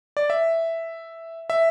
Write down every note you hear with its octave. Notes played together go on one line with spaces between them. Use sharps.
D5
E5
E5